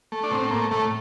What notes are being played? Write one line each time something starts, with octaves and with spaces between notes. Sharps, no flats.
A3
D4
A2 C4
A3 A#3
A2 A3